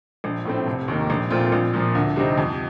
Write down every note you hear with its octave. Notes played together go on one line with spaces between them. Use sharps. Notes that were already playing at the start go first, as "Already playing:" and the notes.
A#1
A2 A3 C4
F1
D#2 D#3 A#3
A#1
A#2 A3 C4 F4
A#1
A#2 F3
D2
C3 G3 C4 D#4
F2